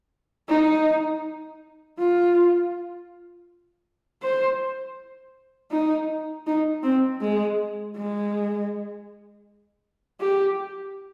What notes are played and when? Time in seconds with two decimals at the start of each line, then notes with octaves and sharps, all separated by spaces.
0.49 D#4
1.99 F4
4.23 C5
5.71 D#4
6.47 D#4
6.84 C4
7.22 G#3
7.97 G#3
10.20 G4